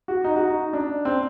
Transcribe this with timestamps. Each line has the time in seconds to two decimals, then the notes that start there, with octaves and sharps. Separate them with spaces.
0.08 F#4
0.24 D#4
0.36 F#4
0.47 D#4
0.73 D4
1.05 C4